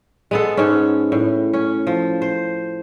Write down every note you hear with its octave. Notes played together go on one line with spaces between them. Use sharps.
G#3 B3 A4
G#2 C#4
A2
C#4
F3
C5